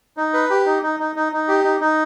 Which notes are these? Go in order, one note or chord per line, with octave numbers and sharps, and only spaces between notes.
D#4
B4
G4
D#4
D#4
D#4
D#4
D#4
G4
D#4
D#4